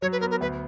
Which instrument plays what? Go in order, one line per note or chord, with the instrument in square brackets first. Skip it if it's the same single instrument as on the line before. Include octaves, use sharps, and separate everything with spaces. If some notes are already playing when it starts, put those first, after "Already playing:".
[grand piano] F#3 [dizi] C#5
[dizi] B4
[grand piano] B3 [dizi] A#4
[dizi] A#4
[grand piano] D2 [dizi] B4